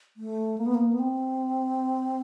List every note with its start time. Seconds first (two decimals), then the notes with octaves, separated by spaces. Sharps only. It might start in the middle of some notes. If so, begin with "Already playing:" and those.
0.17 A3
0.58 A#3
0.66 B3
0.74 A#3
0.93 B3
0.99 C4